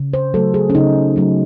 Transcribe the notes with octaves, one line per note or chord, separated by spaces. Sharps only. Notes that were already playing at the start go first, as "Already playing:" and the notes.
Already playing: C#3
C5
F#3 A3 A4
G#4
C#4
C#3 D#4
F#3 A3